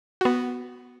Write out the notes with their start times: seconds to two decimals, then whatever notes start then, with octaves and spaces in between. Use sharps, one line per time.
0.21 B3 F#4